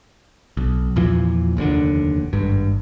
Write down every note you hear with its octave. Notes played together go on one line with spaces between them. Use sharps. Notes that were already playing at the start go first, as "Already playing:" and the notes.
B1
E2 A#2 E3 F3
F1 D#2 B2 D3
G#1 G2